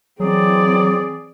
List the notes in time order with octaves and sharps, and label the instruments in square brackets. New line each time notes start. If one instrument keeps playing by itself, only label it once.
[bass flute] E3 [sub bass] F#3 [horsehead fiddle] C4 D5 [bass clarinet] G#4